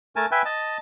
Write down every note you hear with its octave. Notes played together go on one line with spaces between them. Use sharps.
A3 A#4 G#5 A5
B4 E5 G5 G#5
D#5 A5